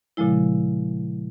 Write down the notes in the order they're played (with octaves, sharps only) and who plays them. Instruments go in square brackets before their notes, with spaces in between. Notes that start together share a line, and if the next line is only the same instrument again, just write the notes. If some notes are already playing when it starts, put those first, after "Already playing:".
[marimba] A#2 C#3 F3 G#3 E4